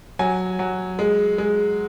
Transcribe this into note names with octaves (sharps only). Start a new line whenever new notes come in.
F#3 G#5
F#3
G#3
G#3